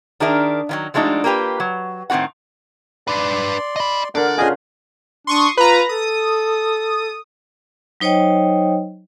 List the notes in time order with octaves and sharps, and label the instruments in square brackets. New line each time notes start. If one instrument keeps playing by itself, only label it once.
[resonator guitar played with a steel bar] D#3 D4 G#4 A#4 E5
D#3 F3 F#3
F3 G#3 A3 D4 D#4 F#4
A#3 F4 G4 B4
F#3
A2 D#3 C4 F#4 F#5
[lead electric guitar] D4 B4 [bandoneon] D5 C6
[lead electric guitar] D#5 B5
[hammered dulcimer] D3 A#4 [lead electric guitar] D5 [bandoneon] F#5
[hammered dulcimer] C#3 F4 F#5 [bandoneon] G#4 D#5 G#5
[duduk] D4 [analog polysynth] C6 C#6 D#6
[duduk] F4 [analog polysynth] B4 A#5
[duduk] A4 [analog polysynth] D#6
[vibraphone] F#3 D#4 C5 C#5 D#5 G5